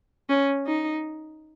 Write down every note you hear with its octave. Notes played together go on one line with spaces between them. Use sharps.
C#4
D#4